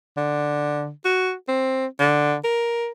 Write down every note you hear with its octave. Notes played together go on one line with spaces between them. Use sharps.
D3
F#4
C4
D3
A#4